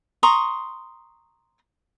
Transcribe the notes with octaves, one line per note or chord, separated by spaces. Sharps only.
A#5 C6 C#6 D#6